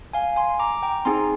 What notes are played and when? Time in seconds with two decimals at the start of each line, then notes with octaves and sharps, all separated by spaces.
0.13 F5 G#5
0.36 G#5 C6
0.59 A#5 D6
0.83 G5 A#5
1.05 C4 D#4 G#4 G#5 C6